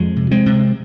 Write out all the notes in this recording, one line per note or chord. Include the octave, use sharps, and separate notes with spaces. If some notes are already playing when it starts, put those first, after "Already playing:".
Already playing: F2 F3 G#3
C3
G#3 C4
C3